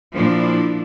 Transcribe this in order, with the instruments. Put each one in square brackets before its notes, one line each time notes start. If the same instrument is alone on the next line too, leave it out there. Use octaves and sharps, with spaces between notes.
[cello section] A#2 F3 D4 E4